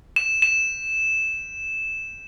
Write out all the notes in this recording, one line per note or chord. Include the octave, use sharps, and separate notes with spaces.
E7
E7